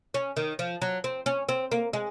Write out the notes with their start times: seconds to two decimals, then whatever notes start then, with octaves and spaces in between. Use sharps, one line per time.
0.14 C#4
0.37 D#3
0.59 F3
0.82 F#3
1.04 C4
1.26 C#4
1.49 C4
1.72 A#3
1.93 G#3